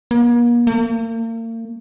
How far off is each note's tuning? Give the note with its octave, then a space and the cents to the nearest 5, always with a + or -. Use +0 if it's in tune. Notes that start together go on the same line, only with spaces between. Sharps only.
A#3 +40
A#3 -40